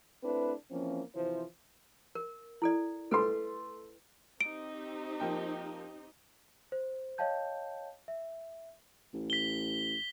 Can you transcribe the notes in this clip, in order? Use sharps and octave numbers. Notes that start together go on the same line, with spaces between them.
A3 C4 D4 E4 B4
E3 F3 A#3 C4 C#4
C3 E3 F3 E4 C5
A#4
E4 A4 D5
A3 A4 B4 C6
C4 D#4 G4 D7
F3 A#3 G5
C5
C#5 D#5 F5 G5 A5 G6
E5
A1
B6 G7